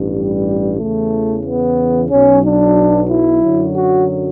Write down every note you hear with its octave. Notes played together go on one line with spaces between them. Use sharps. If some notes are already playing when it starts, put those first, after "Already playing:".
Already playing: A1 G2
G3
E2 C#3 E3 A3
B3
B1 B2 F#3 C#4
D4
E4
F#2 D3 F#3
F#4